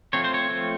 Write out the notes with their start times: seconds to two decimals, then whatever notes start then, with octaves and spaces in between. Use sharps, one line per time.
0.13 F3 A3 C4 C#5
0.24 C5
0.34 C#5
0.49 F3 A3 C4